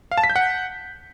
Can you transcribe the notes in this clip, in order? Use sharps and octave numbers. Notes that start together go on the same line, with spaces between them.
F5
A5
B6
G6
F#5